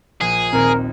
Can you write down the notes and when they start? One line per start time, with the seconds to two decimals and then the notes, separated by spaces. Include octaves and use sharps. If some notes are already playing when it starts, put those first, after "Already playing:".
0.21 A#1 G#4
0.53 D#2 A#2 C4 A#4